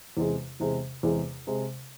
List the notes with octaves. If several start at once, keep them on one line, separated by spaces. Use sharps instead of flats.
E2 C3 G#3
E2 C3 G#3
E2 C3 G#3
C3 G#3